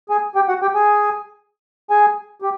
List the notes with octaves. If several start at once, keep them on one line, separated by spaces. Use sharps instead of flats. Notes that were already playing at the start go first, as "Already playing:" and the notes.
G#4 G#5
G4 G5
F#4 F#5
G4 G5
G#4 G#5
G#4 G#5
G4